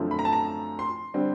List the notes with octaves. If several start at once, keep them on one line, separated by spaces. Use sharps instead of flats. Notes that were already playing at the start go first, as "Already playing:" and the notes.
Already playing: F#2 D3 F3 A3 C4
B5
A#5
A5
A#5
C6
D3 G3 C4